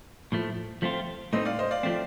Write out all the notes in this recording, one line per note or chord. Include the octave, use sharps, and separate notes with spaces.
A2 F3 A3
F3 A3 C4 F4
A2 A3 C4 D#4 C5 D#5
D5 F5
C5 D#5
D5 F5
F3 A3 C4